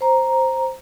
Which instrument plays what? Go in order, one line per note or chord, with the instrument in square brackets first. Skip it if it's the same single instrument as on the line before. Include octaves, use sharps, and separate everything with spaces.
[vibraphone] C5 A#5